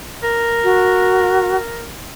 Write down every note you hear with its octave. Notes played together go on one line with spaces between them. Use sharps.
A#4
F#4